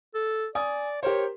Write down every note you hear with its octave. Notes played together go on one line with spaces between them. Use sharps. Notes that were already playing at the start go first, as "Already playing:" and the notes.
A4
D5 G#5 D#6
G4 A#4 C5 C#5